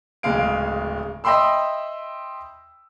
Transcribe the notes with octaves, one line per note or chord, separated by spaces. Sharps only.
D1 C#3 G#3 F5 D7
D#5 E5 G5 B5 C6 E6